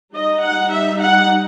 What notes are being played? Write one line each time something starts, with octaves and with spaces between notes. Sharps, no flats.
G3 D#4 D#5
F#5
E5
F#5